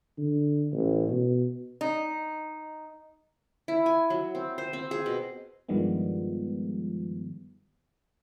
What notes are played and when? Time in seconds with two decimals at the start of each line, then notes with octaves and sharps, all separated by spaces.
0.18 D3
0.72 A1
1.09 B2
1.81 D#4
3.68 E4
3.86 G#5
4.10 F#3
4.35 C4
4.58 C5
4.73 C4
4.91 G#4
5.06 B2
5.69 G2 D#3 F3 G3 G#3 B3